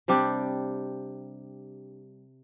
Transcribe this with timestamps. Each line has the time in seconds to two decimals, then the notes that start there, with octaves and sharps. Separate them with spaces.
0.08 C3 G3 D4 G4